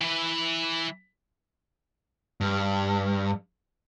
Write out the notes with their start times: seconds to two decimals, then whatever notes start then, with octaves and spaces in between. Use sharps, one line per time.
0.01 E3 B4
2.41 G2